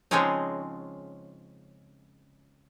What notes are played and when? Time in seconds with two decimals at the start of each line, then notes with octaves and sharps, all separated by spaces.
0.11 C#3 F3 G#3 C4 C#4 D#4